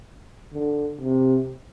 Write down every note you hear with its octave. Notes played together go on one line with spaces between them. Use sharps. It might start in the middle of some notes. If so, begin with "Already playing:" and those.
D3
C3